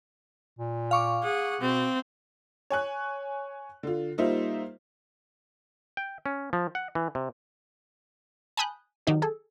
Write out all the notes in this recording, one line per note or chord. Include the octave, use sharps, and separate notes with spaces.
A#2
F5 C#6 D6
G#4 F#5
B2 C4
C#5 G#5 F#6
D3 F4
G3 A#3 D#4 F4 C5 E5
G5
C#4
F3
F#5
E3
C3
G#5 A5 B5 D#6 F#6 G6
D#3 F#3 D#4 G4
G#4 A4